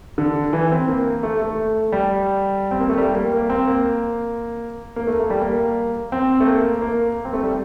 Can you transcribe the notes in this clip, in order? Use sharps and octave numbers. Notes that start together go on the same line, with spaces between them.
D3
E3
C4
A#3
A3
A3
G3
C4
A#3
A3
G3
A#3
A#3
C4
A#3
A#3
A3
A3
G3
A#3
C4
A3
A#3
A#3
C4
A3
G3